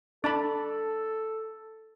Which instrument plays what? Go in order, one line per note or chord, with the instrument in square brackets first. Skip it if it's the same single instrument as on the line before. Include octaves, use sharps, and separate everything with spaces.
[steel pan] D4 A5 B5 [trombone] A4